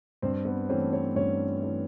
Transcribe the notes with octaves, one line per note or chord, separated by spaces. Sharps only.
G2 C4 C5
B3 B4
E3 A3 C4 C#4 C5
C#4 C#5
G2 C#4 C#5
E3 A3 C#4